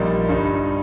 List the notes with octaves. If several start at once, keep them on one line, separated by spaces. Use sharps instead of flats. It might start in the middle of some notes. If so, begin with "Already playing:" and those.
Already playing: A#1 A#2 G3 A#3 D#4
G1 G2 G3 D#4